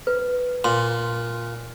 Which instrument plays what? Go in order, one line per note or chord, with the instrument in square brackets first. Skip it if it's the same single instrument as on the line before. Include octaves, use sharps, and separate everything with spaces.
[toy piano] B4
[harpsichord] A#2 [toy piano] C6